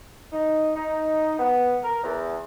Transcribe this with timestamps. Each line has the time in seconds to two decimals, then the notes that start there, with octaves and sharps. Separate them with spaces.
0.33 D#4
0.76 D#4
1.39 B3
1.84 A#4
2.04 E2